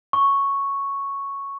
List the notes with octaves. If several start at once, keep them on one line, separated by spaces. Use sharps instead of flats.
C#6